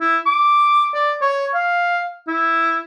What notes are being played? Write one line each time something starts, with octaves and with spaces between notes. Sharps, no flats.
E4
D6
D5
C#5
F5
E4